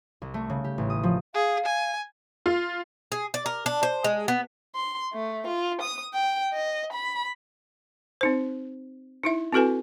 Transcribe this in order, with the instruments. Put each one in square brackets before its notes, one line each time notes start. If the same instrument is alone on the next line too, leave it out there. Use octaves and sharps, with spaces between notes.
[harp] C2
A3
C#3
G4
A1
D#6
F3
[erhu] G#4 [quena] F5
[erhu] G#5
[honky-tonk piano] F4
[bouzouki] G#4
D5
A#4
D4
C5
G#3
B3
[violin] C6
A3
F4
D#6
G5
D#5
B5
[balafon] C4 D#4 C5
D#4 E4 E5
C4 E4 F#4 A4 B4 G#5